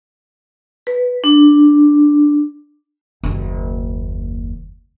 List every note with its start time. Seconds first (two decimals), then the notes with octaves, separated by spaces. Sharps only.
0.87 B4
1.24 D4
3.23 F#1 D#2